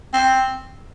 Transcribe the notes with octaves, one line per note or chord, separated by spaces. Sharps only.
C4